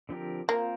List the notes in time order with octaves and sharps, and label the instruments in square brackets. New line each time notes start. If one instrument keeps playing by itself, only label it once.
[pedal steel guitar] D3 F3 C4 G4 A#4
[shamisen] A#3 [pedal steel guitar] C4 F4 A#4